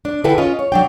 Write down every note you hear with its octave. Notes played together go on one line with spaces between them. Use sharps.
D4
D3 E4 G#4 A4 B4 G5
C#4 F4 D#5
C#5
F#3 D4 G5